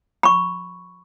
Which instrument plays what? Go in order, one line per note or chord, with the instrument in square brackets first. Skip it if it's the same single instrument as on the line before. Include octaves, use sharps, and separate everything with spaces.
[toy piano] B5 C#6